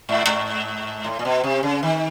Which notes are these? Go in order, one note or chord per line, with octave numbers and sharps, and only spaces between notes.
G#2
G#2
A2
A#2
B2
C3
C#3
D#3